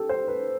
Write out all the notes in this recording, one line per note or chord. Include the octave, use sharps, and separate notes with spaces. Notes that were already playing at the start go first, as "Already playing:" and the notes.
Already playing: G4 A4
C5
B4